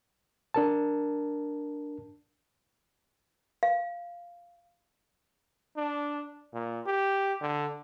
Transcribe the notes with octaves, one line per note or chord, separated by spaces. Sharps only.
D4 A#4 A5
F5
D4
A#2
G4
D3